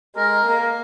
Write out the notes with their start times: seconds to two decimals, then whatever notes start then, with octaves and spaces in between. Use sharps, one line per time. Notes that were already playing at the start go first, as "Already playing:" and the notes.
0.17 G#3 A#4
0.46 A#3